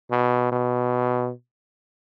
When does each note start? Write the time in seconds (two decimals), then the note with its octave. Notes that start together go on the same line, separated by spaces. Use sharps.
0.11 B2
0.52 B2